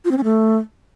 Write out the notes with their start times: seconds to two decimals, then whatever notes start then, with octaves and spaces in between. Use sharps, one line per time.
0.05 F4
0.11 C4
0.18 C#4
0.24 A3